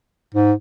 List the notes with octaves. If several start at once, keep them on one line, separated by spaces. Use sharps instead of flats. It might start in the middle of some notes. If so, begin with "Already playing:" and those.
G#2